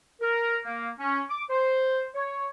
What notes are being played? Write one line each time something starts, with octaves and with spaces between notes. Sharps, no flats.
A#4
A#3
C#4
D6
C5
C#5